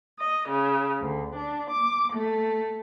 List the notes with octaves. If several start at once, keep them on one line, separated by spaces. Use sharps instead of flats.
D#5
C#3
D2
D4
D6
A3